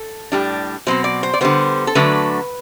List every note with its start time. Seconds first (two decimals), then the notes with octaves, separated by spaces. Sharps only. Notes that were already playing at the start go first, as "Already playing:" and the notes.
Already playing: A4
0.32 A2 G3 D4
0.87 B2 F#3 C4 C5
1.04 D5
1.23 C5
1.34 D5
1.41 D3 G3 B3 C5
1.87 A4
1.95 D3 F#3 A3 D4 B4